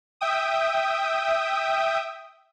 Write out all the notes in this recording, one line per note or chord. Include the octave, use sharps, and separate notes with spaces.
E5 G5 D#6